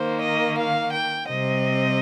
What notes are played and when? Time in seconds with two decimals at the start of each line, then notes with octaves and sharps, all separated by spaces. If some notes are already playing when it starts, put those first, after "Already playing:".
Already playing: D#3 A#3 C5
0.23 D#5
0.59 F5
0.94 G5
1.28 C3 G3 C4 D#5